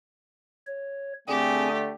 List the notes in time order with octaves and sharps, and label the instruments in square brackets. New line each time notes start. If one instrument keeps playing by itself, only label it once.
[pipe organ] C#5
[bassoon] D3 [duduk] A3 [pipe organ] C4 G#4 G#5 [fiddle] G4